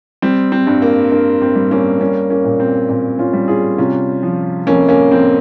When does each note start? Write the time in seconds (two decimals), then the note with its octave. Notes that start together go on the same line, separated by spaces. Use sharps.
0.22 G3 C4
0.52 C4
0.67 G2
0.82 A#3
1.12 G2 A#3
1.42 C4
1.55 G3
1.71 A#3 C#4
2.00 G3 A#3 C#4
2.30 A#3 C#4
2.45 A#2
2.60 C4
2.89 A#2 C4
3.19 C#4 F4
3.33 G3
3.48 F4 G#4
3.78 C3 C#4 F4
4.23 F3
4.67 F2 A#3 C#4
4.89 A#3 C#4
5.12 F2 C4